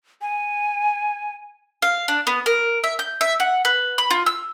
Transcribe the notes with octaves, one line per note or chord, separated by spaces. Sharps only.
G#5
F5
D4
B3
A#4
E5
G6
E5
F#5
B4
B5
F4
E6